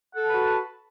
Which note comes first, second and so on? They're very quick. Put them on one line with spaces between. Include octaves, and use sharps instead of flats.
F#5 A4 A5 B4 F#4